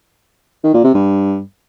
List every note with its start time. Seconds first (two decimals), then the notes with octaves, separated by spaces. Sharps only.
0.64 D#3
0.74 A#2
0.84 C3
0.94 G2